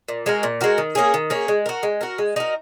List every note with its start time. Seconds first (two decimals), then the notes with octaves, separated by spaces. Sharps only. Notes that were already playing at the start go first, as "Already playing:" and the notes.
0.08 A#2
0.26 G#3 F#4 A#4
0.43 A#2
0.61 G#3 F#4 A#4
0.78 D#3
0.95 A#3 C#4 G#4
1.14 D#3
1.30 A#3 C#4 G#4
1.48 G#3
1.66 F#4 A#4
1.83 G#3
2.01 F#4 A#4
2.18 G#3
2.36 D#4 F#4 A#4